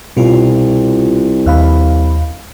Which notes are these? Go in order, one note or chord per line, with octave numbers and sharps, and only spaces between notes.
C2 B2 F4
D#2 F5 B5